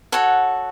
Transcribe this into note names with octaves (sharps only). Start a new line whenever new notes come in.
F#4 A4 C#5 F#5